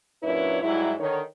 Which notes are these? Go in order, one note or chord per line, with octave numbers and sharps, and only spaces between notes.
F#2 A#2 D4 E4 B4 C#5
G#2 F#3 G3 E4
D3 D#3 C#5